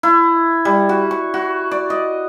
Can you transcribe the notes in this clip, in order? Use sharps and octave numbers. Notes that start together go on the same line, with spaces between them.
E4
G3
F#4
C#6
F#4
D5
D#5